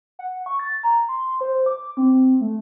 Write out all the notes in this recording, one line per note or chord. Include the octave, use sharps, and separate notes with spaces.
F#5
C#6
A6
A#5
C6
C5
D6
C4
A3